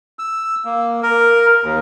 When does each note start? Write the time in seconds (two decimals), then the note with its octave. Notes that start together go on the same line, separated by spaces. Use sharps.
0.19 E6
0.65 A#3
1.03 A#4
1.63 D#2